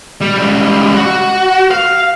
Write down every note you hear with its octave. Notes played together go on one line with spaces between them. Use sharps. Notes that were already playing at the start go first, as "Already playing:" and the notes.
G3
C#2 G3
F#4
F5